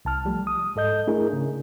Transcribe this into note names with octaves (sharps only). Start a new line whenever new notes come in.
C2 A5 F6
F3 G3 A3
D#6
G#2 A4 D#5 G6
A3 D4 E4 G#4 A#4
C#3